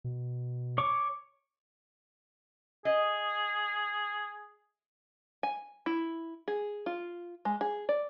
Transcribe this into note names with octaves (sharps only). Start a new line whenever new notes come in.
B2
C#5 C#6 D6
G#4 D#5
G#5
E4
G#4
F4
G#3
G#4
D5